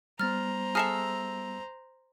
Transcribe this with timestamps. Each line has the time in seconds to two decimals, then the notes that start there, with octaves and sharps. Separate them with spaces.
0.19 G3 B3 C5 A#5 F6 A6
0.75 G#4 A4 E5 F6 A#6 C7